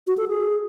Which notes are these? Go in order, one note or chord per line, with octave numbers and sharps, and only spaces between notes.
F#4
A4
G#4